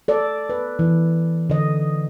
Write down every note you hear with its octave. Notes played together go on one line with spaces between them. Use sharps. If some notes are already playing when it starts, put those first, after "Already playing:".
A4 D5
B4
E3
D3 D#5